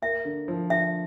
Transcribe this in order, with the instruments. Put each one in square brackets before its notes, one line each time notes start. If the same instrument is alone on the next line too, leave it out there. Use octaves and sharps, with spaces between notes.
[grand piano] A#3 [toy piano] E5
[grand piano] D3
F3
[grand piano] D3 [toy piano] E5